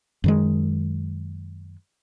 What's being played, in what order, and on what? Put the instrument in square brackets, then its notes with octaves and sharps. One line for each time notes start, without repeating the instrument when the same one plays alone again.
[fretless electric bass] F#2 D#3 G#3